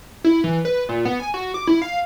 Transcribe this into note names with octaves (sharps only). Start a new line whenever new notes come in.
E4
E3
B4
A#2
B3
G#5
F#4
D6
E4
F5